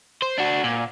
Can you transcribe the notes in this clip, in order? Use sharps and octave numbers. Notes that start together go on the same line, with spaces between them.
C5
D4 F#4
A#2